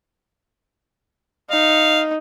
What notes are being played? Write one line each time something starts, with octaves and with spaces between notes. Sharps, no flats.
D#4 F5